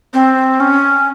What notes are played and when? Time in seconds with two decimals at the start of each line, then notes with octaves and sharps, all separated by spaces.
0.14 C4
0.60 C#4